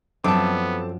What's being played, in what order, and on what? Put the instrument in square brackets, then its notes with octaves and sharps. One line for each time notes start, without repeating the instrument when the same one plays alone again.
[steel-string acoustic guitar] F#2 F3 [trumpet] B3 [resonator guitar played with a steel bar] C4 A4 [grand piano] A5 D6